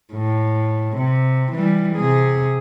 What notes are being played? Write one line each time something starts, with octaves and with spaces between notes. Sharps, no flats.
A2
C3
E3 G3
C3 G#4